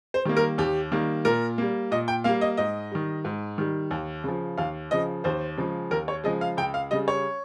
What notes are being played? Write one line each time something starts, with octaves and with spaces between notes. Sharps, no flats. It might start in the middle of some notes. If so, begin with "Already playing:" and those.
C5
D#3 G3 A#3
A#4
D#2 G4
D#3 G3 A#3
A#2 A#4
G3 A#3
A#2 D#5
G5
G3 A#3 F5
D#5
G#2 D#5
D#3 G3
G#2
D#3 G3
D#2
C#3 F3
D#2 F5
C#3 F3 D#5
D#2 C5
C#3 F3 G#3
D#2 A#4
C#5
C#3 F3 G#3 D#5
F5
C#2 G5
F5
C#3 G3 D#5
C#5